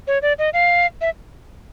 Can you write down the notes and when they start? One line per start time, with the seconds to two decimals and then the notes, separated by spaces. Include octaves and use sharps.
0.07 C#5
0.22 D5
0.39 D#5
0.53 F5
1.01 E5